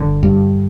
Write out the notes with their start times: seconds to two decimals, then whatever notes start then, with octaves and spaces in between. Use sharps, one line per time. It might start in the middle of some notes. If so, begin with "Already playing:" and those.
Already playing: G1 D3
0.23 G2